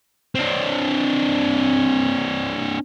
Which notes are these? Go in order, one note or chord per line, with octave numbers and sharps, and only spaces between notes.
C4 D4